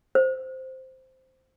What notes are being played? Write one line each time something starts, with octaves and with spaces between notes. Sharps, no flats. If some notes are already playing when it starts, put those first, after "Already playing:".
C5